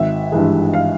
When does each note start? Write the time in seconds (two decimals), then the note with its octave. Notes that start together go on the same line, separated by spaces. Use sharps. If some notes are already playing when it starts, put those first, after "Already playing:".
Already playing: G#1 E5
0.32 G2 E3 G#3
0.74 F5